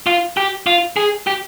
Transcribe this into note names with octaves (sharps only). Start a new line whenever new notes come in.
F4
G4
F4
G#4
G4